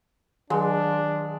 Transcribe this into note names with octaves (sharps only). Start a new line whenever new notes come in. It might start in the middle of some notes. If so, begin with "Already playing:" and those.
D#3 F#3 G#3 D4